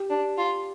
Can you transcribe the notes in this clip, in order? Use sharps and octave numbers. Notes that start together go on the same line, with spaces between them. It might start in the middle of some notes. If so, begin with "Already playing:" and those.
Already playing: G4
D4
F4